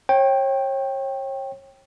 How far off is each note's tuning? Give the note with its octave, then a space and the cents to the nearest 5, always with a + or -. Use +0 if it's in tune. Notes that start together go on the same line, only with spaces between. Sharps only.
C#5 -35 G5 +0